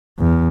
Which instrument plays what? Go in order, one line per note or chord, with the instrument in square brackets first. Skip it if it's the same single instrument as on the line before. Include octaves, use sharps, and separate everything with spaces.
[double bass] E2